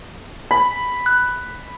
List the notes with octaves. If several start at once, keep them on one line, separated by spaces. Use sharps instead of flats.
B5
F#6